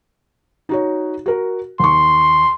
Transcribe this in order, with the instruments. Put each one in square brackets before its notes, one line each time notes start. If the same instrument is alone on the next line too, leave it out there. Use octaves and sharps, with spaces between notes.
[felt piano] D#4 F#4 C#5
F#4 A#4
[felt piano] D#2 C#6 [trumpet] C6